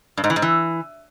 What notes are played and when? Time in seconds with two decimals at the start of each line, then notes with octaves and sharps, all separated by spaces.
0.17 G2
0.24 G#2
0.30 E3
0.36 G#2
0.42 E3